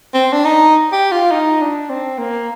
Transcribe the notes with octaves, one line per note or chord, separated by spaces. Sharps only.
C4
D4
D#4
G4
F4
D#4
D4
C4
A#3